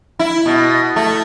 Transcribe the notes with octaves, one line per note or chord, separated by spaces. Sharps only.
E4
B2
A3